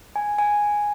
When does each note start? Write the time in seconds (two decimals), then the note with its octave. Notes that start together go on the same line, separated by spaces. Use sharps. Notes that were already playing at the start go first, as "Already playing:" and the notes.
0.16 G#5
0.39 G#5